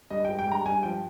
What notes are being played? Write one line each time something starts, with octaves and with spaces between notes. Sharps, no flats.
G2 D#5
G#3 G5
G5
G2 A#5
G2 G#5
F3 G5